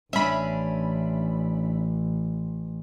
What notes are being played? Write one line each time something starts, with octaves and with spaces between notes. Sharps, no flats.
A1 C#4 D4 E5 B5